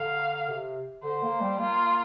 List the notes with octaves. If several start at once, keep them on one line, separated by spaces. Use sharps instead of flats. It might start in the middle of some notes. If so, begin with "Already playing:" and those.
Already playing: D3 F5
C3
D3 C5
A#3
G3
A#3 F4